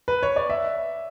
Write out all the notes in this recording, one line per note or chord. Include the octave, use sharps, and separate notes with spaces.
B4
C#5
D5
E5